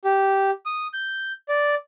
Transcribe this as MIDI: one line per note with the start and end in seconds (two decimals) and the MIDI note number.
0.05 0.51 67
0.66 0.87 87
0.93 1.32 91
1.49 1.75 74